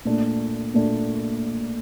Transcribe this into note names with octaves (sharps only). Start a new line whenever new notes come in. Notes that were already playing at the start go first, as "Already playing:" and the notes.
A#2 A3 D4
A#2 A3 D4